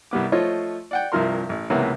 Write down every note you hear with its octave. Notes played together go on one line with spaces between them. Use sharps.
C2 G3 B3 D6
F3 A3 F4 C5 C#5 D#5
D5 F#5 G5
C2 G2 C3 F3 A#4 C6
A1
C#2 C3 E3 A#3 B3 C#4